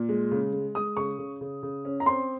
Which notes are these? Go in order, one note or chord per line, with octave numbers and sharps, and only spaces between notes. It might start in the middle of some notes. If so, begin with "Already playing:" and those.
Already playing: A#2
G#3
C#3
G#3
G#3 D#6
C#3 C#6
C#3
C#3
C#3
C#4
A#5
C4 C6